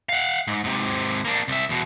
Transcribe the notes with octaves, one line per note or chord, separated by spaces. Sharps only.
F5 F#5
G#2
G#2 C3
A#3 D4
C2 E5
E2 B2